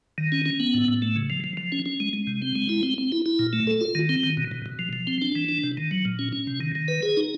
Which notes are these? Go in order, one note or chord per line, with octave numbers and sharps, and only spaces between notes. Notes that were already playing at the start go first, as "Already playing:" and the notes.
D#3
C#4
C#4
B3
A2
A2
A3
C#3
F3
F3
F3
C#4
C#4
G#3
G#3
C3
C4
G#3
E4
C4
C4
E4
E4
A#2
A3
A4
F4
D#3
C4
D#3
B2
B2
B2
F3
F3
C4
D4
E3
D4
C3
D#3
F#3
A#2
C#4
C#4
C3
D#3
D#3
B4
G#4
D#4